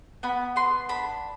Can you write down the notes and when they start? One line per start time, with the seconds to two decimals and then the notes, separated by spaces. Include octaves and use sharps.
0.23 B3 B5
0.56 B3 C6
0.89 D4 B5